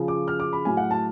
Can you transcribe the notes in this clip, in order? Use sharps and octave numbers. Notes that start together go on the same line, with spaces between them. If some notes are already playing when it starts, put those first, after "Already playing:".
Already playing: C#3 F3
D6
F6
D6
B5
A2 F#3 G#5
F#5
A5